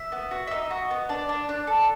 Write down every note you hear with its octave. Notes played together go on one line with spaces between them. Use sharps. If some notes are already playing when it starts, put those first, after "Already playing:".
Already playing: E5
B3
F#4
E5
D#4 D#5
F#4
B3
D4 D5
D4
D4
A4